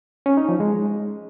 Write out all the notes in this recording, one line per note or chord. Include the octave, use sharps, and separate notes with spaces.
C#4
D#4
F3
G#3